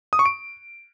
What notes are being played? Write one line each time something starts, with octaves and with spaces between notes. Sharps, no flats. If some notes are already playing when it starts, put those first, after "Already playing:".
D#6
C#6
D7